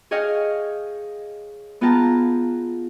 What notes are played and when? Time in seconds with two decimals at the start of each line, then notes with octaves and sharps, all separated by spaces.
0.11 G#4 C#5 D#5 F5 G5
1.81 B3 F4 G#4 G5 A5 A#5